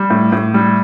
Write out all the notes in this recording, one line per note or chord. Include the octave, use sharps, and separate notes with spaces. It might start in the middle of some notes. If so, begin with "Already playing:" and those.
Already playing: G3
A2
A2
G3